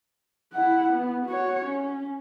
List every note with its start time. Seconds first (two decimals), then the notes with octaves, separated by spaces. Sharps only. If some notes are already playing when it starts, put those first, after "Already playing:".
0.53 E4 F#5
0.92 B3
1.25 F#4 C#5
1.66 C#4